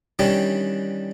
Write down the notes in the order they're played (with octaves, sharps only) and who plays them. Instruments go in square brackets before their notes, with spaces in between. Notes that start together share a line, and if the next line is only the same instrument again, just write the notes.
[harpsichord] D#3 E3 G3 C#4 D4 G4